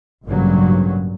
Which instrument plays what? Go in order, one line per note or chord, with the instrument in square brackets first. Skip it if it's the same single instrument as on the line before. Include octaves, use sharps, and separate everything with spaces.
[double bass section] A1 G2 A#2 C#3 F#3